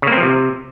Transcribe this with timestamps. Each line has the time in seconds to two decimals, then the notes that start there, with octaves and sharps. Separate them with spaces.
0.02 C#3
0.07 A#3
0.12 C4
0.17 F3
0.23 C3